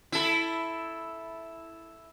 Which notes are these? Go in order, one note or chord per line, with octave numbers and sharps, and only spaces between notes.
E4 A4